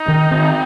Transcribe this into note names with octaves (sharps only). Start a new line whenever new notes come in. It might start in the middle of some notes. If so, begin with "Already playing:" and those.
Already playing: D#4
D#3
C4